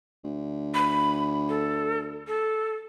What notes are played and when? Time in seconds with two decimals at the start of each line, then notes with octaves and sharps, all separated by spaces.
0.24 D2
0.74 B5
1.49 A4
2.27 A4